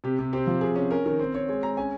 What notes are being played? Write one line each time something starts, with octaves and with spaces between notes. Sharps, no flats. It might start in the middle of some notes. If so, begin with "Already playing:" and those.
C3 G4
C3
C4 G4
F3
C3 G#4
C#4
C#4 A#4
D#3
C4
C4 C#5
G#3 C#5
G#3 A#5
C#4 G#5